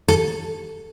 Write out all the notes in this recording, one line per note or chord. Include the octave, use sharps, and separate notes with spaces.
A4